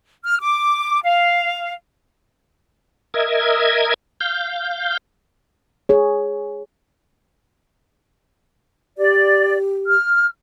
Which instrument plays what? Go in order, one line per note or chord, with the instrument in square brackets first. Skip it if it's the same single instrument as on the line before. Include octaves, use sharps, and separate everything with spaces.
[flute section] F6
D6
F5
[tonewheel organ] A#4 D#5 E5 G#6
F5 G6
[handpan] G#4 C#5
[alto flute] G4 [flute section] D5
[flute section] F6